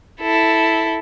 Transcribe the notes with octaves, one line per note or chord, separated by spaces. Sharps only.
E4 A4